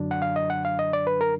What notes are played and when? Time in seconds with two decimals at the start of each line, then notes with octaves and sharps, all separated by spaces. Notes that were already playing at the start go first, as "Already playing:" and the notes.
Already playing: F#2 D3 F#3 D4
0.11 F#5
0.22 F5
0.36 D#5
0.50 F#5
0.65 F5
0.79 D#5
0.93 D5
1.07 B4
1.21 A#4